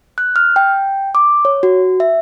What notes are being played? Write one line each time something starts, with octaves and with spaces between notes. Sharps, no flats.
F#6
F6
G5
D6
C#5
F#4
E5